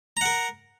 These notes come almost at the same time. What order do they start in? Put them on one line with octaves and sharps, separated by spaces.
A#5 F#5 A#4